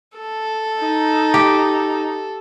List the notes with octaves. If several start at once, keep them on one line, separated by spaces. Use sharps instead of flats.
A4
D#4
G4